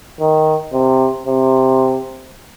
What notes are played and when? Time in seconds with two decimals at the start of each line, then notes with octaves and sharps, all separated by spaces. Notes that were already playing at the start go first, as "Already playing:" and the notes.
0.20 D#3
0.73 C3
1.27 C3